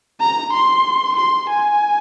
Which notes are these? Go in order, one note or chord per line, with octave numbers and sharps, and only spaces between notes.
A#5
C6
C6
G#5